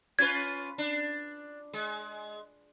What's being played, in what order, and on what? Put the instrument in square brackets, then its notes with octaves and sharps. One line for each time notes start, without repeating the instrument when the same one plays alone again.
[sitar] C#4 F4 B4 [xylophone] G#6
[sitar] D4
G#3